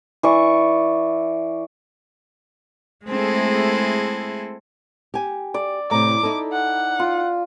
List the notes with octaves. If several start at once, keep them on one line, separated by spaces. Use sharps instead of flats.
E3 D5 C#6
G#3 A3 C4 E4 G#4 A4
G4 G#5
D5
A2 C3 A#5 D6
D#4 E4 A4
F#5
F4